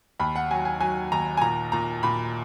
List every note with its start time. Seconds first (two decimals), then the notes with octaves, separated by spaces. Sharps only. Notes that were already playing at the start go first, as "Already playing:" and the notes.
0.20 D#2 B5
0.36 F#5
0.51 F#3 G#5
0.65 G#5
0.81 F#3 G#5
1.12 D#2 A#5
1.37 G#5
1.41 A#2 A#5
1.72 A#2 A#5
2.03 A#2 B5